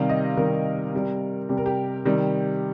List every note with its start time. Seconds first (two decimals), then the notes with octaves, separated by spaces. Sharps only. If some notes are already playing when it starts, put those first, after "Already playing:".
Already playing: C3 D#3 G3 F5
0.09 D#5
0.37 C3 D#3 G3 A#4
0.93 C3 G3
1.49 C3 G3 G4
1.57 A#4
1.66 G4
2.05 C3 D#3 G3